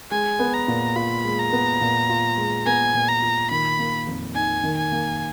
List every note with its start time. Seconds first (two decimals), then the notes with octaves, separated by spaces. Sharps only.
0.11 G#3 G#5
0.39 B3
0.53 A#5
0.68 A#2
0.96 F4 B5
1.25 G#3
1.38 A#5
1.52 B3
1.81 A#2
2.10 F4
2.37 G#3
2.66 B3 G#5
2.94 A#2
3.08 A#5
3.22 F4
3.51 D#3 B5
3.79 A#3
4.07 F2
4.35 D#4 G#5
4.63 D#3
4.77 G#5
4.92 A#3